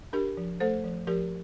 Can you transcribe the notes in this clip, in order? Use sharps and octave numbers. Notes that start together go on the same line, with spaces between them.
D4 G4 A#4
F3
A3 A4 C5
F3
F3 G4 A#4